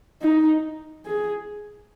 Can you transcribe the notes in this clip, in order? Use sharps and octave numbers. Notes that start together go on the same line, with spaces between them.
D#4
G#4